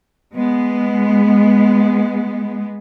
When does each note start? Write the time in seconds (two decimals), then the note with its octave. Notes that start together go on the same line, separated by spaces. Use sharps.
0.36 G#3 B3